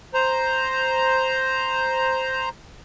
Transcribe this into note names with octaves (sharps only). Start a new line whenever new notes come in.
C5 A#5